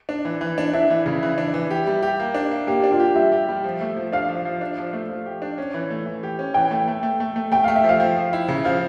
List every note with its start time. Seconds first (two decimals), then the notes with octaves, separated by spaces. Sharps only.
0.09 D4
0.25 E3
0.41 E3
0.58 D4
0.74 D4 E4
0.90 E3
1.06 C#3
1.23 E3
1.38 D4
1.54 E3
1.70 G4
1.87 G3
2.02 G4
2.19 A#3
2.35 D4
2.51 A#3
2.67 A#3 G4
2.84 D4
2.92 F4
3.00 G4
3.15 G3 E5
3.32 G4
3.48 G3
3.64 F3
3.81 A3
3.97 F3
4.13 D4 F5
4.29 F3
4.45 F3
4.61 D4
4.78 F3
4.93 A3
5.09 F3
5.26 G4
5.42 D4
5.58 C#4
5.74 E3
5.90 A3
6.06 E3
6.23 G4
6.39 C#4
6.54 E3 G5
6.71 A3
6.88 A3
7.03 A3
7.20 A3
7.36 A3
7.52 A3 G5
7.64 A3 F5
7.76 E5
7.84 F3
7.89 F5
8.00 F3
8.16 F3
8.33 E4
8.48 C#3
8.65 F3 F5